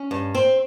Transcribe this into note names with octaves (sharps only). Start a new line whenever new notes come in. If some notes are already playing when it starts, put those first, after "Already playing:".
Already playing: C#4
G2
C4